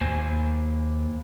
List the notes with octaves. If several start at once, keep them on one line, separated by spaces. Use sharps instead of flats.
D#2 A#3 C5 G#5